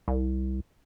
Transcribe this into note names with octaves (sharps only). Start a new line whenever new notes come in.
C2